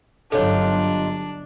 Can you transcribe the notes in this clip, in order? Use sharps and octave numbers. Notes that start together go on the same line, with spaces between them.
G1 F#3 D4 D#4 F4 G4 A4 C#5